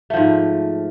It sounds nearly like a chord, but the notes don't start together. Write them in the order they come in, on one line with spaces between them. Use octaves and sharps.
A3 F3 G#2